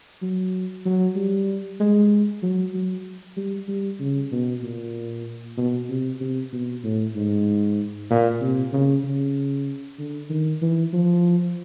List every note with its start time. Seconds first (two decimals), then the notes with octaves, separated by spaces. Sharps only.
0.22 F#3
0.85 F#3
1.16 G3
1.80 G#3
2.42 F#3
2.74 F#3
3.37 G3
3.68 G3
4.00 C#3
4.32 B2
4.63 A#2
5.57 B2
5.89 C3
6.20 C3
6.53 B2
6.83 A2
7.15 G#2
8.10 A#2
8.42 C3
8.73 C#3
9.04 C#3
9.98 D3
10.30 D#3
10.62 E3
10.93 F3